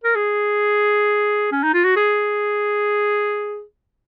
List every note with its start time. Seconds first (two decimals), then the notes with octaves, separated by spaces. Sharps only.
0.04 A#4
0.16 G#4
1.52 C#4
1.63 D#4
1.74 F4
1.84 F#4
1.96 G#4